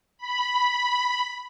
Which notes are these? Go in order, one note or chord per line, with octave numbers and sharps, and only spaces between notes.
B5